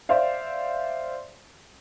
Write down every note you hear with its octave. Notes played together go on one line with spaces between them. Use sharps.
C5 D5 E5 F5